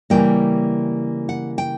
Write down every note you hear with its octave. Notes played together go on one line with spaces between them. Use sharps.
C#3 E3 G3 A#3 G5
F#5
G5